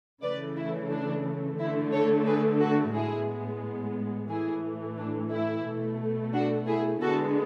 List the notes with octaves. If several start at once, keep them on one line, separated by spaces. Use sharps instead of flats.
C#3 E3 A3 B4 D5
E4
D4
D3 A3 E4
A4 C#5
G#4 B4
F#4 A4
A2 G#3 B3 E4 G#4
A2 E3 A3 E4 G#4
D4
E4
B2 A3
D4 F#4
E4 G#4
D3 G#3 B3 F#4 A4